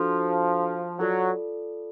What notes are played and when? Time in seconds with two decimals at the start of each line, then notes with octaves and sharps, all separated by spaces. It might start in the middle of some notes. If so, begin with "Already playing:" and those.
Already playing: F3 D4 F#4 A4
0.99 F#3 F4 A4 D5